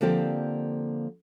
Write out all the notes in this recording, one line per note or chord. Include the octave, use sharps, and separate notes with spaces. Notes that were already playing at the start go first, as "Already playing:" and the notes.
D3 F3 A#3 C4 G4 D5